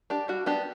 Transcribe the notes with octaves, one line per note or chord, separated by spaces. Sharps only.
D4 G4
G3 F#4
B3 D4 G4